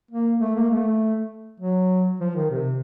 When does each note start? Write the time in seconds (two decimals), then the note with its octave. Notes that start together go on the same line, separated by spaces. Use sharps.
0.11 A#3
0.40 A3
0.55 A#3
0.70 A3
1.60 F#3
2.20 F3
2.35 D#3
2.50 C3